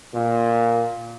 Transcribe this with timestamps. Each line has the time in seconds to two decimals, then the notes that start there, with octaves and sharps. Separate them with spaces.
0.14 A#2